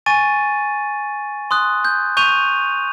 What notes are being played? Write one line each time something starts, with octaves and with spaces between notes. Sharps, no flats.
G#5 C#6 A6 D#7
C6 D#6 F#6
G6
C#6 G6 D#7 F7